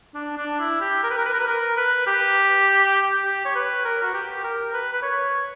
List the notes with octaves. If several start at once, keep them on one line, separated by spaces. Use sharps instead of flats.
D4
D4
E4
G4
A#4
B4
A#4
B4
A#4
B4
A#4
B4
G4
G4
C#5
B4
A#4
F#4
G4
A#4
B4
B4
C#5